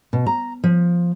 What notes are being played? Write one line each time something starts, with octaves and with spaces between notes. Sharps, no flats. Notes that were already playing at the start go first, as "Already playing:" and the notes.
B2
A#5
F3